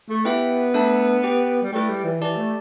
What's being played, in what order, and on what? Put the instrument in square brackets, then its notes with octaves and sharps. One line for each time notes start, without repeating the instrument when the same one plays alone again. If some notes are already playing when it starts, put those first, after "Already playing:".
[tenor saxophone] A3
[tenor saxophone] B3 [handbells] E4 G4 B4 E5 G5
[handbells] A3 D4 A4 E5 A5
G4 B4 G5
[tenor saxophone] G3
[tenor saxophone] A3 [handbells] E4 B4 D5 G5
[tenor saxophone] G3
E3
[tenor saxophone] E3 [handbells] G4 D5 A5
[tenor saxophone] A3